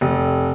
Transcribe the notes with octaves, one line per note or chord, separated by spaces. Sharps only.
F1